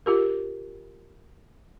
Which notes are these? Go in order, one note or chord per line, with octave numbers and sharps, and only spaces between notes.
F4 G4 A#4